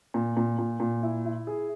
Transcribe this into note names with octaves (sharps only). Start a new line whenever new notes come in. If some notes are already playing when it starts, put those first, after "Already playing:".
A#2
A#2
A#2
A#2
E4
E4
G#4